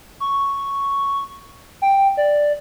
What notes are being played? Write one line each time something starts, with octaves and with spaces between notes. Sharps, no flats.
C#6
G5
D5